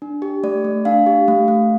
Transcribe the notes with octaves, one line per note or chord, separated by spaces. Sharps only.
D4
G4
A3 D5
A3
D4 F5
G4
A3
A3